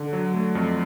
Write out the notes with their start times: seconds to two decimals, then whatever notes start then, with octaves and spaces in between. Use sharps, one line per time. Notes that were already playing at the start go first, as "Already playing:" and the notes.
Already playing: D3
0.13 F#3
0.34 A3
0.55 F2